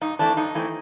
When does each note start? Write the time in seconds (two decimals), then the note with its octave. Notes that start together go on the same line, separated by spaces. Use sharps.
0.01 G2 D#4
0.19 E3 A3 C4 D4
0.37 G2 D#4
0.55 E3 A3 C4